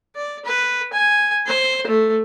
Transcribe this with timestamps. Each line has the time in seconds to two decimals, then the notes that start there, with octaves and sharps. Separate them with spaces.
0.16 D5
0.45 B4
0.93 G#5
1.46 C5
1.87 A3